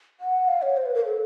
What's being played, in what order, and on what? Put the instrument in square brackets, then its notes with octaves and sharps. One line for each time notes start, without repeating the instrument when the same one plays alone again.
[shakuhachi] F#5
F5
C#5
C5
B4
A#4
A4